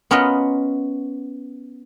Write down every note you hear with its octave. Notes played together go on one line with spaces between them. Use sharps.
B3 C#4 F4 A#4 D#5 F#5